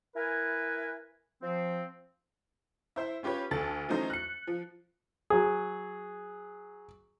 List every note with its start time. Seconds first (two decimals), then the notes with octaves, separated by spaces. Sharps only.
0.16 E4 A#4 B4 G#5
1.42 F3 C4
2.96 E4 C5 E5
3.23 C#4 F4 G4 B4 C#5
3.51 D2 A4 A6
3.89 E3 F#3 A3 C#4 D#4 C5
4.10 F#6 C#7
4.47 F3
5.30 F#3 G#4